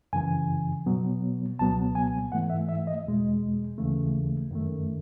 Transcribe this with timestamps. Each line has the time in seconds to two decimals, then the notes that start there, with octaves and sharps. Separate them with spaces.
0.13 F#2 C#3 E3 G#5
0.86 B2 F#3 B3
1.59 C#2 B2 F#3 B3 A5
1.95 G#5
2.32 G#2 E3 A3 F#5
2.50 E5
2.69 E5
2.87 D#5
3.05 E2 B2 G#3
3.78 D#2 C#3 E3 A3
4.51 F#2 D#3 A3